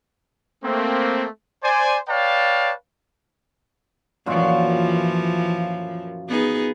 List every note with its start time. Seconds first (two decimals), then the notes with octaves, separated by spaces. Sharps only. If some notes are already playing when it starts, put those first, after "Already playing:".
0.63 A3 A#3 C4
1.63 C5 D5 G#5
2.08 B4 C#5 D5 F5 G5 A5
4.26 F#2 A#2 E3 F3 F4
6.28 B3 D#4 G#4